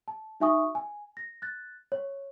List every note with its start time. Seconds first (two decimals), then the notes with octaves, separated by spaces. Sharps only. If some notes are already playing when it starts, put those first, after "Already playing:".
0.08 A5
0.40 D#4 F#4 E5 G#5 C#6 D#6
0.75 G#5
1.17 A#6
1.42 F#6 A6
1.92 C#5